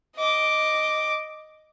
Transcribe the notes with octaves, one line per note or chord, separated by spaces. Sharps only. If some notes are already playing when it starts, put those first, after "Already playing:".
D#5 D6